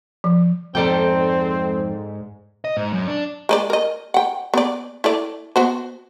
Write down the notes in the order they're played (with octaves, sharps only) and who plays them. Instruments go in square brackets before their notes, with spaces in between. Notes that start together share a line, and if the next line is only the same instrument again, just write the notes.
[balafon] F3
[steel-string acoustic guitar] F2 A#5 [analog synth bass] G#2 [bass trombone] C4 [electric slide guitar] A4 D5 G5
[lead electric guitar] D#5
G#2
F#2
D4
[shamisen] G#3 B4 D5
A#4 D#5
F#5 G5
B3 D5
E4 A4 D5
B3 F#4 C5